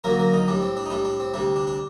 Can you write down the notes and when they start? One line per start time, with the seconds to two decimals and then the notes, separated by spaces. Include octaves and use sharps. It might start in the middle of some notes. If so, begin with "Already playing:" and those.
0.04 F#2 D3 F#3 A#3 A#4
0.19 A#3 A#4
0.33 D#3 D#4
0.48 A2 G3 D4
0.62 C4
0.77 D4
0.86 D#4
0.90 A2 G3 D4
1.05 D4
1.20 C4
1.34 D2 C3 G3 D4
1.56 D4
1.67 D4